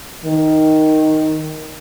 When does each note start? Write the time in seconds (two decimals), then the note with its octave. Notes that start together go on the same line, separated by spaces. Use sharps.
0.25 D#3